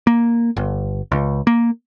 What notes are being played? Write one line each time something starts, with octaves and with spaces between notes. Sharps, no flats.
A#3
G1
C#2
A#3